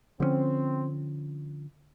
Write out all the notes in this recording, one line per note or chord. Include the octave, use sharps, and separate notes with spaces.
D3 F3 A3 C4 C#4